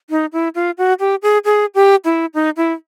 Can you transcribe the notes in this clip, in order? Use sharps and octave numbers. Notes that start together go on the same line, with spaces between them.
D#4
E4
F4
F#4
G4
G#4
G#4
G4
E4
D#4
E4